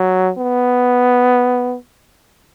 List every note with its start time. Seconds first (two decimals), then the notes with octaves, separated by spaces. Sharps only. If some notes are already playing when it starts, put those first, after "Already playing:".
Already playing: F#3
0.38 B3